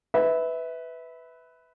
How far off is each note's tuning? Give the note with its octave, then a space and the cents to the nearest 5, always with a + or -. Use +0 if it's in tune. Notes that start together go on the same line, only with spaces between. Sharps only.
B4 +10 E5 -20